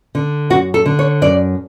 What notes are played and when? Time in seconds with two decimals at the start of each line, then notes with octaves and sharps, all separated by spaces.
0.15 D3
0.50 F#2 F#4
0.74 A4
0.86 D3
0.99 C#5
1.22 F#2 D5